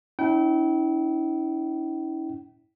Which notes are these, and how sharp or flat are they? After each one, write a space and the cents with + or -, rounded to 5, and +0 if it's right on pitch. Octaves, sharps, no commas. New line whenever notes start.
C#4 +30 E4 -30 G5 -35